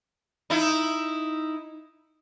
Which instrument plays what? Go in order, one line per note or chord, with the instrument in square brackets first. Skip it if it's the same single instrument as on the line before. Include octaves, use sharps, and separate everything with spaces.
[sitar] D#4 E4